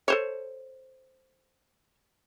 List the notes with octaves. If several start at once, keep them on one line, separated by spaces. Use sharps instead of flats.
A4 C5 C#5